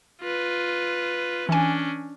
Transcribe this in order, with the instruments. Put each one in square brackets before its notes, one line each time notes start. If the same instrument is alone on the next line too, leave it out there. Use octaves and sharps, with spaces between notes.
[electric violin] F4 B4
[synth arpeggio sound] E3 G#5 [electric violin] C#4 D4